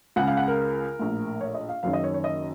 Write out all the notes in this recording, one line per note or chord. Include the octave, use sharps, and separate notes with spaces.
C#2 C#3 F#5
F5
F#5
A#4
A#1 A2
C#5
D#5
F5
F#1 F#2 D#3 F5
D#5
C#5
C#5
D#5